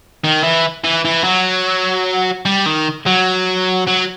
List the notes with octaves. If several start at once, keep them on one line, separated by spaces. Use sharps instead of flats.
D#3
E3
E3
E3
F#3
G3
D#3
F#3
F#3